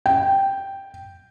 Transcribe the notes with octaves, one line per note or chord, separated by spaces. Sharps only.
G5